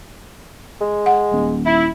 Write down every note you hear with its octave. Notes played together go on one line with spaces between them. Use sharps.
G#3
F#5
D#1
E4